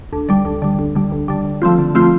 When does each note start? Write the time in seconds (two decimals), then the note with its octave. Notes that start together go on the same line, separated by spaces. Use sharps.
0.13 D2
0.29 D3 G3
0.45 D2
0.62 D3 G3
0.79 D2
0.95 D3 G3
1.12 D2
1.28 D3 G3
1.45 D3
1.62 F3 A3 C4 F4
1.79 D3
1.95 F3 A3 C4 F4